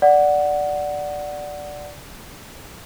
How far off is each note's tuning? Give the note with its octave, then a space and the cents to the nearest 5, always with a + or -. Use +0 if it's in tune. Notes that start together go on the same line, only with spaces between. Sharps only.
D5 +0 F#5 +0